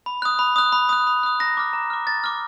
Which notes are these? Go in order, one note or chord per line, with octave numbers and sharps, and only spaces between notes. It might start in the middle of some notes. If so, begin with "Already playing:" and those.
B5
D#6 F#6
B5
D#6 F#6
B5
D#6 F#6
B5
D#6 F#6
A#5 A#6
D6 F6
A#5
D6 F6
A#5 A6
D6 F6